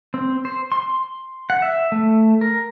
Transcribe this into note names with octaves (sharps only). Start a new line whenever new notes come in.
C4
C5
C6
F#5
E5
A3
A#4